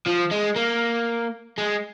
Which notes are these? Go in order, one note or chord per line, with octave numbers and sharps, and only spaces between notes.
F3
G#3
A#3
G#3